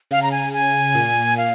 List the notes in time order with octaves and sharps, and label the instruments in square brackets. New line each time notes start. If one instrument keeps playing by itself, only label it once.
[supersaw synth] C#3 [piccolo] F5
[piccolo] A#5
G#5
G#5
[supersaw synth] A#2
[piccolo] F5